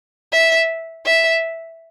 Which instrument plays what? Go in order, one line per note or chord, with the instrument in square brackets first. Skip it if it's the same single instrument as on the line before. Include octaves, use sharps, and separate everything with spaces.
[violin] E5
E5